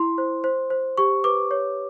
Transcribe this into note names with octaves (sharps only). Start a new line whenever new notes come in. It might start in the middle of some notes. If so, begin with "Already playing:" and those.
Already playing: E4 C6
C5
C5
C5
G4 C#6
B4 D6
C#5